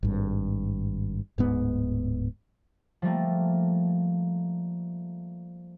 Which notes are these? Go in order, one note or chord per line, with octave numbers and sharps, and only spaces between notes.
G#1 G2
D1 G#2 B3
F3 G3 A3 A#3